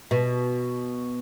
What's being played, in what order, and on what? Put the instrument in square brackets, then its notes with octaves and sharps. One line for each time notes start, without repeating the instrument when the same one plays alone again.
[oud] B2